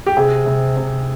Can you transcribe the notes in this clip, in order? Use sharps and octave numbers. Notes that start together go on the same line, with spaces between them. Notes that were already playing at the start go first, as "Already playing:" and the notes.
G4
C3 G#4
C3
C3